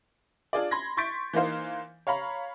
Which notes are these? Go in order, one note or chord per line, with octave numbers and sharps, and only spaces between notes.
D4 F4 G#4 D5
B5 C6 G#6 A#6
C6 C#6 G6 A6 B6 D7
E3 A#3 D#4 C5 F5
C#5 F5 A#5 B5